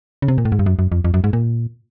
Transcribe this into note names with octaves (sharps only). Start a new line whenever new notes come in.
C#3
C3
A#2
A2
G#2
G2
F#2
F#2
F2
F2
F#2
G#2
A#2